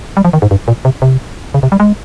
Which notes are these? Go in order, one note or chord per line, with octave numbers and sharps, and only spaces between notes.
G3
F3
D#3
G#2
G2
A#2
C3
C3
C#3
C3
G3
G#3